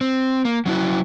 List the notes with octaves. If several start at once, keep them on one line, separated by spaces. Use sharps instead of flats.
C4
A#3
F#3 C#4 E4 F#4